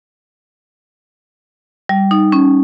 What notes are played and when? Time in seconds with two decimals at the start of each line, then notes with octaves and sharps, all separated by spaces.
1.89 G3
2.11 D#4
2.32 C#4